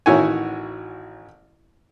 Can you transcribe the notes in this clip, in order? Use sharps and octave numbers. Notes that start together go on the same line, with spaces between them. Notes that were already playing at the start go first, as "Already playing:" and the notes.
A1 D#3 E4 F#4 C#5 G#5